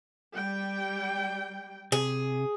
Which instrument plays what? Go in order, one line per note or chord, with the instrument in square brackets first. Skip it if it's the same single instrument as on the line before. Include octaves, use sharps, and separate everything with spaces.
[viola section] G3 G5
[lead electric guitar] C3 [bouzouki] G#4